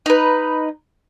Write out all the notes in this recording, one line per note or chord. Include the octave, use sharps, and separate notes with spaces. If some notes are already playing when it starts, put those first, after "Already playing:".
D#4 B4